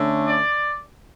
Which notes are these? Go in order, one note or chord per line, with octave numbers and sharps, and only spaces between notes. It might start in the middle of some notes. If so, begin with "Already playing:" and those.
Already playing: D3 A3 C#4
D5